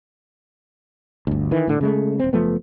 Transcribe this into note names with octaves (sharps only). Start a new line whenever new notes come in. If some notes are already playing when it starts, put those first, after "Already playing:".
G1 D2
D#3 E3
A2 D3
C#3 G#3 A3
D#1 C4
F#1 F3 A3 B3